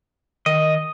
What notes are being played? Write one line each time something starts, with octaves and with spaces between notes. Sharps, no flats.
D#3 D#5